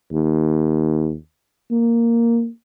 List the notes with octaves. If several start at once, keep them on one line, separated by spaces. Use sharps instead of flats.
D#2
A#3